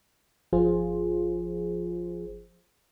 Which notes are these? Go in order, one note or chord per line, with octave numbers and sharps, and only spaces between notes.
G1 F3 F4 G#4 C5